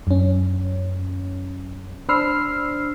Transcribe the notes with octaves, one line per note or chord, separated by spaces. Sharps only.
F#2 C#4
D4 C5 B5 E6 F6 C7